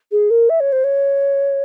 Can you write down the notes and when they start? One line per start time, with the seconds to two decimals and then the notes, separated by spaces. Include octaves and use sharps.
0.12 G#4
0.30 A#4
0.49 E5
0.60 C#5
0.72 C5
0.84 C#5